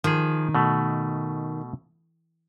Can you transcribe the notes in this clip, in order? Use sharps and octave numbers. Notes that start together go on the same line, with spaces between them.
D#3 F3 G#4
B2 A3